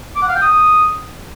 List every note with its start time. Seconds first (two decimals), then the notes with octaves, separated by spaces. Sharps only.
0.16 D6
0.22 F#5
0.29 F5
0.35 G5
0.42 D#6